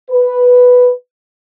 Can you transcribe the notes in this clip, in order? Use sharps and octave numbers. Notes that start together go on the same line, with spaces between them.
B4